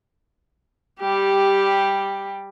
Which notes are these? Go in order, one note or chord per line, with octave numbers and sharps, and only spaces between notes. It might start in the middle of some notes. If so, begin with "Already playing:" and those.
G3 G4